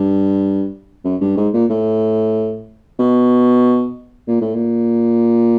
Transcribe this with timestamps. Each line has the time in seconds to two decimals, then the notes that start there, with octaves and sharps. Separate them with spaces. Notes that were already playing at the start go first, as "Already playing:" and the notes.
Already playing: G2
1.05 F#2
1.21 G2
1.37 G#2
1.54 A#2
1.70 A2
2.99 B2
4.28 A#2
4.41 A2
4.55 A#2